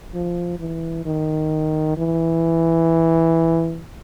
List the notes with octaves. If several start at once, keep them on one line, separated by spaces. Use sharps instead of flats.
F3
E3
D#3
E3